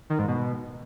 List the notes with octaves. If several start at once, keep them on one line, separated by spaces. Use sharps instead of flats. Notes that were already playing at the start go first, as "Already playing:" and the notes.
D#3
G#2
B2